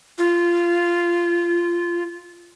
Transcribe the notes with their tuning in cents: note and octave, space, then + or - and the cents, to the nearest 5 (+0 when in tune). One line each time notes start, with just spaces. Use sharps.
F4 -15